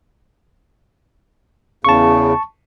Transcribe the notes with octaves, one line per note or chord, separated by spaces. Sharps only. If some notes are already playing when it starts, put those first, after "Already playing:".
E2 C#3 A5 C#6